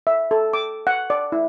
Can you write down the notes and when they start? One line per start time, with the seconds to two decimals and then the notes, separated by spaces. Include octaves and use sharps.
0.07 E5
0.31 A4
0.54 D6
0.87 F#5
1.10 D5
1.32 E4